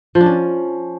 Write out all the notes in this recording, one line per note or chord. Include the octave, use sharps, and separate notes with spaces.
F3
D4
C#4